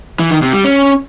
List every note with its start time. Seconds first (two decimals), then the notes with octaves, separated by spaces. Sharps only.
0.19 E3
0.31 D#3
0.42 C3
0.53 G3
0.64 C#4